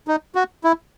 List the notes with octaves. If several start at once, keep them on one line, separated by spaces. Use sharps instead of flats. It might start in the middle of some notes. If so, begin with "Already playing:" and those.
D#4
F#4
E4